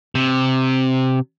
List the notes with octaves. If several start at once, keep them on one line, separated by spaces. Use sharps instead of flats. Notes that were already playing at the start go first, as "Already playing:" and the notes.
C3